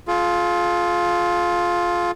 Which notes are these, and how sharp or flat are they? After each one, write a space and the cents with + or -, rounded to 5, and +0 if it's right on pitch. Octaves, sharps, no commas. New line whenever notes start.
F4 +5 G#4 +45